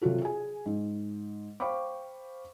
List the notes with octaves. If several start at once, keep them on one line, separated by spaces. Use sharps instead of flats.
C3 F#3 F4 F#4 A4
G#4 G#5
G#2
C5 F5 G5 B5 C#6 D6